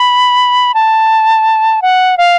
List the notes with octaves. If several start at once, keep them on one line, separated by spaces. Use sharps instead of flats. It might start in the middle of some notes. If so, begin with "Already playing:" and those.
Already playing: B5
A5
F#5
F5